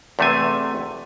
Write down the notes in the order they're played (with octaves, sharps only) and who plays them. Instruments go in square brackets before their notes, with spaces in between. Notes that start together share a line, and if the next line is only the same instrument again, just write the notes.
[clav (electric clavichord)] E2 C3 A3 F5 G#5